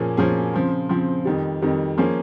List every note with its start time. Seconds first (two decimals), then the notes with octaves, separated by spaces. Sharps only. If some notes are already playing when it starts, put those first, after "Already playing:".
Already playing: A#2 F3 A#3 C#4 G#4
0.17 A#2 F3 A#3 C#4 G#4
0.53 C#3 F3 C4
0.89 C#3 F3 C4
1.25 F2 D#3 G3
1.62 F2 D#3 G3
1.98 F3 A#3 C#4 G#4